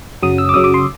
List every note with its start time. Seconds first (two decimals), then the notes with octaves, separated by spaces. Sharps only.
0.23 F#2 C#3 F#3 D#6
0.38 E6
0.49 D6
0.54 F#2 C#3 F#3 D#6
0.64 D6
0.74 C6